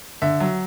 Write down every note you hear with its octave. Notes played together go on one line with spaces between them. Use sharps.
D3 E5
F#3